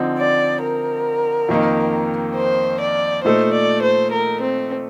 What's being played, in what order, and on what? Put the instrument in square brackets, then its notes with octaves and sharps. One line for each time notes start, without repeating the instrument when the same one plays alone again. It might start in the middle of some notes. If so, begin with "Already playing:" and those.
Already playing: [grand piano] D3 F3 C4 D#4
[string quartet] D5
A#4
[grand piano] F2 D#3 A#3 D#4
[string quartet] C5
D5
[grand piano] A#2 A3 D#4 A4 [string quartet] C5
[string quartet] D5
C5
A#4
C4